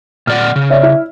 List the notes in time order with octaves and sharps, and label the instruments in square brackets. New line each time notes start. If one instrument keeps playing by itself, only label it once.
[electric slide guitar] A#2 D5 F#5 [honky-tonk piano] F6
[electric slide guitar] C#3
[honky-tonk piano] C#5 D5 E5
E4